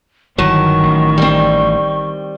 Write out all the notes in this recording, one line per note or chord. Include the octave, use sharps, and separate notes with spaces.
G1 D#3 E3 F#3 A5 C#6
A1
G3 C4